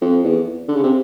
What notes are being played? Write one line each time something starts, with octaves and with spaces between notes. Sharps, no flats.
F2
E2
D3
C#3
C3